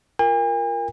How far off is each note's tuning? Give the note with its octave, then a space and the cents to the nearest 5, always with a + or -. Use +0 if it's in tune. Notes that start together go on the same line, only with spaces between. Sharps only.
F4 +0 A#4 +0 G#5 -45